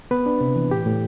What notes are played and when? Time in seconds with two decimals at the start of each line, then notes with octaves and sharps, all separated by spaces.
0.11 B3 B4
0.26 D4
0.41 C3
0.56 E3
0.71 A2 G4
0.86 A2